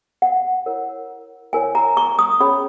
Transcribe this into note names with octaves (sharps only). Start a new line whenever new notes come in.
F#5
E4 A#4 C#5
E4 A#4 C#5 G#5
A#5
C#6
D#6
C#4 G#4 C#5 B5